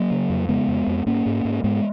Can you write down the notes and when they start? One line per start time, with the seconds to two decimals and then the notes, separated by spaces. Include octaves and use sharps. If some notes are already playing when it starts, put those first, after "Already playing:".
Already playing: F#3 A#3
0.11 C#3
0.30 F2
0.49 C#3 G#3 B3
0.68 F2
0.87 F2
1.06 G#2 A#3 C#4
1.26 G#2
1.45 G#2
1.64 G#2 G#3 B3